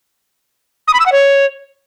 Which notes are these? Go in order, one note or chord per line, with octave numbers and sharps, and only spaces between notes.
D#6
B5
E6
F#5
C#5